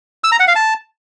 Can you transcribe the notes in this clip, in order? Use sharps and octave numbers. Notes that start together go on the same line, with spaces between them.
E6
A#5
F#5
F5
A5